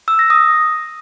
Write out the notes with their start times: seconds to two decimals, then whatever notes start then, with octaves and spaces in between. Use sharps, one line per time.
0.08 E6
0.19 A#6
0.30 D#6